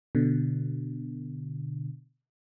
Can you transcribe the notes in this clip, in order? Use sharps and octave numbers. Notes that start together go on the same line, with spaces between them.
B2 D3